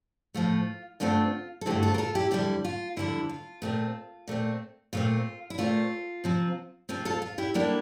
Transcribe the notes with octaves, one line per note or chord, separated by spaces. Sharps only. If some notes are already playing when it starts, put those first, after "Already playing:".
A2 F3 A3 F4
G2 D3 A3 C4 F4
A4
G2 D3 A3 C4 E4 G4
F4 A4
A#4
F4 A4
E4 G4
F2 D3 G3 E4 G4
F4
F2 D3 G3 E4
F4
A#2 A3 C4
A#2 A3 C4
A#2 A3 C4 F4
E4
A#2 A3 C4 F4
C3 F3 C4
C3 F3 C4 F4
F4 A4
F4
E4 G4
D3 G3 A#3 D4 E4 G4